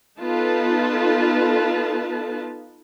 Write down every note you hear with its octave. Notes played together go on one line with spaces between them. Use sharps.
B3 D#4 F4 A4 B4 A5